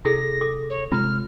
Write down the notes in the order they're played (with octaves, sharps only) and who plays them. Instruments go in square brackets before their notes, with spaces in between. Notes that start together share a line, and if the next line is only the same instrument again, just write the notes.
[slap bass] C3 [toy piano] E4 G#4 A4 [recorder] A#6
[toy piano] A4 D6
[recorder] C#5
[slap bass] C3 G#3 C4 [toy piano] F4 A#5 [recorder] F6